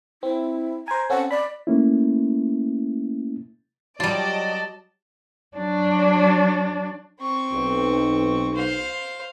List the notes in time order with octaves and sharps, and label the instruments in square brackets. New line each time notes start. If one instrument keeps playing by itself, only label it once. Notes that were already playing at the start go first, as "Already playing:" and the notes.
[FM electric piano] C4 [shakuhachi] E4
[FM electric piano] C5 G#5 [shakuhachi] A#5
[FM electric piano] C4 C#4 A4 [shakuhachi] F#5
[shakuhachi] D5 [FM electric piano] B5
[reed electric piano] A3 A#3 C#4 E4
[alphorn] F#3 [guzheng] G3 F4 [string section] D5 D#5 [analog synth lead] A5
[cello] F#3 D4
[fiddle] C4 C#6
[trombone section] B1
[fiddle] C5 F5